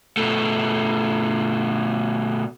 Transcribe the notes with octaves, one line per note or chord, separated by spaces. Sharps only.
B2 A3